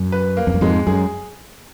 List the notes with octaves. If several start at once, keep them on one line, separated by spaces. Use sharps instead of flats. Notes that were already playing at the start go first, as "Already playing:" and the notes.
Already playing: F#2
B4
A#3
F2
F#2
F2 G#2 G#3
F#2 G#4